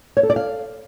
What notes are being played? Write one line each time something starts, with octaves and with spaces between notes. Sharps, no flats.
C#5
A4
D5
F5